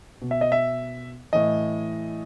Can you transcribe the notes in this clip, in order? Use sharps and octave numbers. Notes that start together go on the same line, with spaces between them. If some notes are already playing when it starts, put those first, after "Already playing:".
B2
E5
D#5
E5
A2 E3 D#5